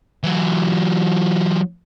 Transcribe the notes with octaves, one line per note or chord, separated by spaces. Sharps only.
E3 F#3